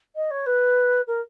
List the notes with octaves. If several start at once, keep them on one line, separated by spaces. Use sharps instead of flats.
D#5
C#5
B4
A#4